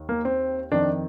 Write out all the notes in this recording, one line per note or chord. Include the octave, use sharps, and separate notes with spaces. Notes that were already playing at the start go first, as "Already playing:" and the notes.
Already playing: D#2 D#3
A#3
C4
F2 D#3 D4